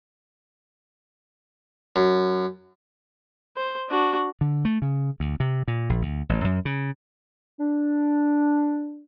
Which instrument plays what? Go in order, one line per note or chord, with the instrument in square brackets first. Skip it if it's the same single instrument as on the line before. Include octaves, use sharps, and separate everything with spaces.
[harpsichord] F#2
[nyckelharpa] C5
D4 F#4
[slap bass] D3
A3
C#3
D2
C3
A#2
A#1
D2
A1
F#2
C#3
[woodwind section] D4